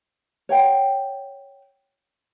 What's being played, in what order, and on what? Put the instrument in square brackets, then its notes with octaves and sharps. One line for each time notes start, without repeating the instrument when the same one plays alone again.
[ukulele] C#5 F#5 G5